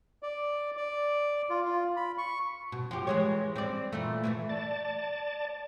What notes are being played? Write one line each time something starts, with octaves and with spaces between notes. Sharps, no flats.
D5
D5
F4
F4
B5
C#6
B2
F3 G4
E3 G#3 C#5
C4 D5
A#2 E3 A3
E3 F#3 A3
D5 A5